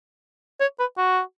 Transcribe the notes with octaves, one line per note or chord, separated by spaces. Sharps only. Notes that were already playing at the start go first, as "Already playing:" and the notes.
C#5
B4
F#4